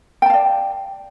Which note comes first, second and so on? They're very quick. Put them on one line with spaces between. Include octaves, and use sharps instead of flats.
G5 A5 F5 D5